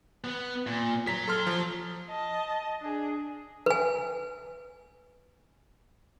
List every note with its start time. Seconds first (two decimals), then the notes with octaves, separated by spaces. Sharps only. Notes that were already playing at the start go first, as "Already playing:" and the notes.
0.24 B3
0.67 A#2
1.07 C#5 A#5 B6
1.28 A4 C6 F6
1.47 F3
2.08 D#5 A5
2.82 D4 G#4
3.66 B4 G#5